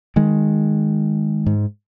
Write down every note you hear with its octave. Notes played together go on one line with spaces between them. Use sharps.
D#3 G#3
G#2